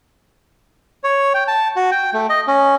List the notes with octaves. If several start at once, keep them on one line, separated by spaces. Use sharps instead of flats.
C#5
G5
A5
F#4
G5
A3
D#5
C#4